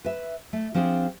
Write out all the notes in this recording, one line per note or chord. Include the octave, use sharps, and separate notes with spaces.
B4 E5
A3
F3 C4 D4 G#4